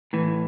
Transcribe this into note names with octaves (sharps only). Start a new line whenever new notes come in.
A2 E3